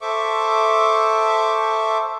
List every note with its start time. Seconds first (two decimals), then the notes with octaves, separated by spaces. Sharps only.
0.01 A4 C5 E5 C#6 D6